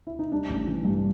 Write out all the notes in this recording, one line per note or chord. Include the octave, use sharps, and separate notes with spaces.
E4
D#4
G3 D4
A1
E3
G2